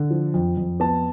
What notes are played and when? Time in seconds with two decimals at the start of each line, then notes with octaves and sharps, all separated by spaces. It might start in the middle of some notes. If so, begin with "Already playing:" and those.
Already playing: D3
0.11 F3
0.34 F2
0.57 F2
0.80 B3 A5